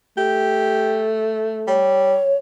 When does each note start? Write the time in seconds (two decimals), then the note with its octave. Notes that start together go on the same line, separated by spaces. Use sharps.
0.17 A3 G4
1.68 G3 C#5